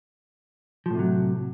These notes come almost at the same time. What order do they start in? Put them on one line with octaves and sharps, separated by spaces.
F3 A2 C3 F#3